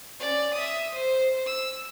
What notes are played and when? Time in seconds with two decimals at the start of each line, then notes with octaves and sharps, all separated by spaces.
0.19 C#4 D5
0.53 E5 D#6
0.93 C5
1.46 E6